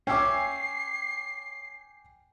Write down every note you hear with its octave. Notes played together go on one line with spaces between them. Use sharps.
C#4 E5 G5 G#5 D6 C7